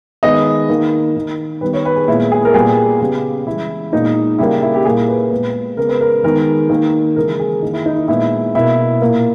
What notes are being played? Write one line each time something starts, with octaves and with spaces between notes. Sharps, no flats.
D#3 G#3 B3 D#5
D#3 A#3
D#3 A#3
D#3 G3 B3 B4
C#5
B4
G#4
A#2 G#3 B3 E4
G#4
A#4
A#2 G3 B3 G#4
C#3 G3 B3 G4
C#3 E3 G#3 E4
A#2 G#3 B3 D#4
C#3 G3 A#3 E4
E4
G4
A#2 A#3 G#4
B4
A#2 G#3 B3 B4
C#3 G#3 B3 A#4
B4
A#4
D#3 G#3 B3 A#4
D#3 A#3
C#3 E3 G#3 A#4
G#4
D#3 A#3 D#4
E4
D#4
E4
A#2 G#3 B3 E4
B2 A#3 E4
A#2 A#3